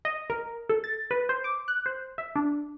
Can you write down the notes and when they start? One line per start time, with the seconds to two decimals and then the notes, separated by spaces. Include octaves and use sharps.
0.05 D#5
0.30 A#4
0.69 A4
0.84 A6
1.11 B4
1.29 C5
1.44 D6
1.68 F#6
1.86 C5
2.18 E5
2.35 D4